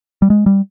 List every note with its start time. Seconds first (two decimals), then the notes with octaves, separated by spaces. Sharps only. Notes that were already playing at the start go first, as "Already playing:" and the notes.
0.22 G3
0.30 G#3
0.46 G3